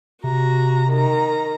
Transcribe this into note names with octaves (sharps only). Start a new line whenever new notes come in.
C3 F#4 A#5
D#3 A#5